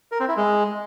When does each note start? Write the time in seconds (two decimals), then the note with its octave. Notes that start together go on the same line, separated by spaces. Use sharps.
0.12 A#4
0.20 C4
0.28 E4
0.37 G#3